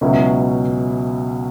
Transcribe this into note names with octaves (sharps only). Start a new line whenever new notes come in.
C#2 B2 F#3 C#4 E4